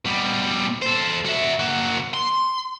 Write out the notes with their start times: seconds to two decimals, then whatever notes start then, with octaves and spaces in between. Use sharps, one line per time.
0.05 B2 G3
0.82 A4 C5
1.25 F#4 E5
1.59 A#3 F#4
2.14 C6